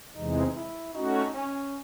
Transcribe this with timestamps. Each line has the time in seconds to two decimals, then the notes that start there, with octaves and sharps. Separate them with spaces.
0.15 E2 C3 E3 G#3 D#4
0.55 E4
0.95 A3 C#4 D#4 F#4
1.34 C#4